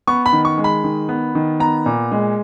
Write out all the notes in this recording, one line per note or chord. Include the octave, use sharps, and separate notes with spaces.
B3 C#6
B5
D#3
C#6
G#3
B5
D#3
B3
D#3
B3 A#5
A#2
G#3